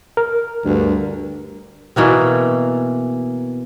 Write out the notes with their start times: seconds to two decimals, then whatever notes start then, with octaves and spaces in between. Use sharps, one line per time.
0.17 A#4
0.65 D2 G2
1.96 B2 E3 A#3 C4